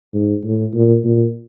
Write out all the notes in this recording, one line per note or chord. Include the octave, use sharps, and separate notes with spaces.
G#2
A2
A#2
A#2